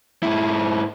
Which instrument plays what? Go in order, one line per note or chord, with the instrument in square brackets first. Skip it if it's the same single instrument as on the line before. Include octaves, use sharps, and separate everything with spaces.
[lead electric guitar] G#2 E4